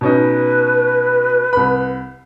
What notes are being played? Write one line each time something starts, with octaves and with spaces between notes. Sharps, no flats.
B2 C#4 D#4 B4
C2 B5